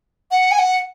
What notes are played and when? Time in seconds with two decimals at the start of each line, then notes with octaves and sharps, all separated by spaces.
0.31 F#5
0.51 G#5
0.59 F#5